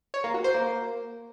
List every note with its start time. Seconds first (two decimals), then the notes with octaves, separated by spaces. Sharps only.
0.14 C#5
0.24 A#3
0.34 F#4
0.44 C5
0.54 A#3